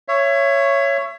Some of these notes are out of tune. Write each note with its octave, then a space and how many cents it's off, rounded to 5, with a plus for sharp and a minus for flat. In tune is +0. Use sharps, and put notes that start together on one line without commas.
C#5 +0 E5 +30